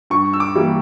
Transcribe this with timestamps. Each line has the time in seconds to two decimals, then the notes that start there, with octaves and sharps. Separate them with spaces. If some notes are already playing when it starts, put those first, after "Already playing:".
0.10 G2 C#6
0.33 E6
0.40 D6
0.56 E3 G3 A#3